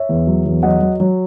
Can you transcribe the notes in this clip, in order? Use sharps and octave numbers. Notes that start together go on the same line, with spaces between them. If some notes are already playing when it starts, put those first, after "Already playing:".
Already playing: C#5 E5
E2
F#3
E2
F#3 D#5 F#5
F#3
F#3